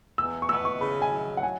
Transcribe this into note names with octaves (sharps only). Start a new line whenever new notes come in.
E2 E6
C#6
B3 E6
C#6
C#3 B5
G#5
F#3
F#5
G#5